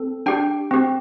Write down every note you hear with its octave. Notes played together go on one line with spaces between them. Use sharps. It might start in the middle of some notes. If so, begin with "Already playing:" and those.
Already playing: C4 A4
D4 G4 G5
C4 G4